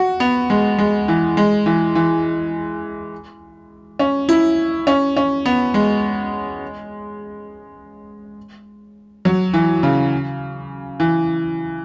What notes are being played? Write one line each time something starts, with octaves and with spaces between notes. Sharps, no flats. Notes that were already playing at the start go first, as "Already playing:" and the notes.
Already playing: F#4
B3
G#3
G#3
E3
G#3
E3
E3
C#4
E4
C#4
C#4
B3
G#3
F#3
E3
C#3
E3